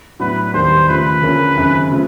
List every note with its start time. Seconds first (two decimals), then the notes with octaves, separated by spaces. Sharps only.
0.20 A2 F#3 B3 D4 F#4 B4
0.54 D#2 D#3 G3 B3 C5
0.89 D#2 C#3 F3 A3 B4
1.22 D2 C#3 F3 A#3 C#4
1.56 G#1 F#2 C#3
1.92 C#3 F3 A3